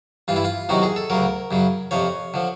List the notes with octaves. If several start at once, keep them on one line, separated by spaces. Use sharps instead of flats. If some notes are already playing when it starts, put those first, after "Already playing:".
G2 E3 F4
E4
F4
E2 C3 D#3 F#3 F#4
G#4
A4
D2 C#3 F#3 A#4
F#2 C#3 F#3
F2 C3 F3 C#5
D3 F3